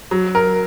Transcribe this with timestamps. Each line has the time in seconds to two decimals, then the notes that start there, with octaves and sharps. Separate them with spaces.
0.11 F#3
0.35 A#4